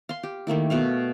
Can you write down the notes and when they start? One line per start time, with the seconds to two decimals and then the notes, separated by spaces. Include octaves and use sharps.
0.09 F5 C6
0.23 G4
0.47 D#3 A3 A#3 E4
0.70 B2 A3 F5